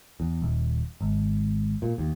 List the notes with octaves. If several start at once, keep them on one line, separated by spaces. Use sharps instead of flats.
E2
D#1
G#1
A#2
D#2